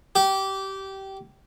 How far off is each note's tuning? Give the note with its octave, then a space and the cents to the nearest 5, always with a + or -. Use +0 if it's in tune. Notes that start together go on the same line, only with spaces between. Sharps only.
G4 -20